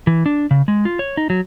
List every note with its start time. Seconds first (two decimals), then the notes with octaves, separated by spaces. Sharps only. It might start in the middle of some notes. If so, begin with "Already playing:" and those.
0.07 E3
0.26 D4
0.51 C#3
0.68 G#3
0.85 F4
0.99 C#5
1.17 D#4
1.30 F#3